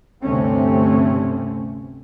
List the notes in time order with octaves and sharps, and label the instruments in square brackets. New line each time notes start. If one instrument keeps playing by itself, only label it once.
[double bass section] D2 G2 C3 A3 C4 C#4